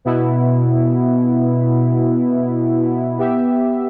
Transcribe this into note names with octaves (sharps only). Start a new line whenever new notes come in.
B2 B3 E4
B3 G4 E5